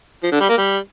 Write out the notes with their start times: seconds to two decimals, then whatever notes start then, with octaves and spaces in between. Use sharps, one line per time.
0.23 F3
0.32 D3
0.41 G3
0.49 A#3
0.58 G3